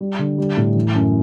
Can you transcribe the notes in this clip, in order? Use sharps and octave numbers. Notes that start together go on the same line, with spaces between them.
G3
D3
G3
A2
E3
F#2